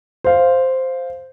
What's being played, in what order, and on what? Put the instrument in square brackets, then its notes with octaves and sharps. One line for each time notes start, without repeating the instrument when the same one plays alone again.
[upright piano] C5 F5